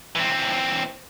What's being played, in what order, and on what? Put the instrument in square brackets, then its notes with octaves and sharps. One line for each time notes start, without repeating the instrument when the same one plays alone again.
[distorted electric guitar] E3 C4